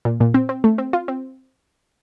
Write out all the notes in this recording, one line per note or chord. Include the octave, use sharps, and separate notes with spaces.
A#2
A#2
C4
C4
A3
C4
F4
C4